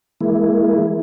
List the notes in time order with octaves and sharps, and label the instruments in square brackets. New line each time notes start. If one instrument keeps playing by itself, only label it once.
[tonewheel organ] E3 G#3 A#3 E4